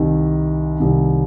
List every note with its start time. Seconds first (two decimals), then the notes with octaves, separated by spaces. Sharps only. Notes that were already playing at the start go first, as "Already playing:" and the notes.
Already playing: C2 C3 D#3
0.80 C2 C3 D#3